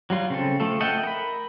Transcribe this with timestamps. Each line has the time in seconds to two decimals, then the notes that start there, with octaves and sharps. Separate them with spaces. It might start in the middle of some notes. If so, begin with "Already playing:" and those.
0.10 F#3 G3 F4
0.30 C#3 C4 A4
0.60 F3 A3 A4
0.80 A4 D#5 E5 F#5 G5
1.03 A#4 B5